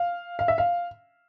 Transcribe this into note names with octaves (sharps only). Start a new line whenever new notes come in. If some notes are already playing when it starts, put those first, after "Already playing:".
Already playing: F5
F5
E5
F5